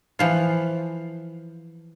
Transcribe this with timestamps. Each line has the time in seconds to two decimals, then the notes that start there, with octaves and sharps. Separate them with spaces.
0.19 E3 F3 F4